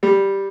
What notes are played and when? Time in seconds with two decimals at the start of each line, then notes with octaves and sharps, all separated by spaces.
0.03 G3